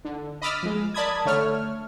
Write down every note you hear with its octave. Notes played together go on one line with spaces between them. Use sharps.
D3
D#5 B5 D6 E6 F6 A6
F3 G#3
A#4 D5 A5 B5 D#6 G#6
D3 A3 C#5 F6